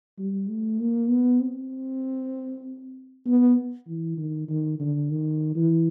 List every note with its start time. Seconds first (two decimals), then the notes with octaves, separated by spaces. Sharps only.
0.19 G3
0.49 A3
0.80 A#3
1.10 B3
1.41 C4
3.26 B3
3.87 E3
4.17 D#3
4.49 D#3
4.80 D3
5.11 D#3
5.56 E3